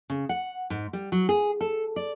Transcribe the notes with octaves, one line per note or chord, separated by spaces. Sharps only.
C#3
F#5
G#2
G3
F#3
G#4
A4
D5